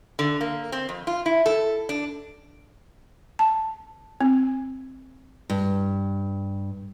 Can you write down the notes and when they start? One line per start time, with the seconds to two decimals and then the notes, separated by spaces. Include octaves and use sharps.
0.19 D3
0.41 A#3
0.72 C4
0.89 F2
1.07 F4
1.26 E4
1.46 A4
1.89 D4
3.39 A5
4.21 C4
5.50 G2